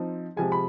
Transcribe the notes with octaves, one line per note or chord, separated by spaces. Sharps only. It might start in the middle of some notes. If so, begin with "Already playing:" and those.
Already playing: F3 C4 D#4
C3 F3 G#3 G#5
B5